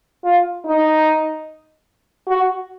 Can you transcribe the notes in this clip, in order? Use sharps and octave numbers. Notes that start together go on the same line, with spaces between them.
F4
D#4
F#4